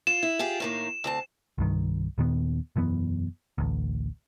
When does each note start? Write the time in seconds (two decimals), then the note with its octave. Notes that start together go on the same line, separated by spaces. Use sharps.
0.07 F4 E7
0.23 E4
0.39 F4 G4 G#4
0.60 A2 D#3 A#3
1.04 D2 C4 A5
1.58 C2 G2 D#3
2.18 D#2 A#2 D#3 B3
2.76 E1 F#2 E3 B3
3.58 A1 D2